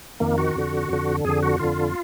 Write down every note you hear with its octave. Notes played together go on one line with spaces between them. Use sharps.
F2 D#3 A#3
F#4
F2 D3
F2 D3
F2 D3 G#4
F#4
F2 D3 F4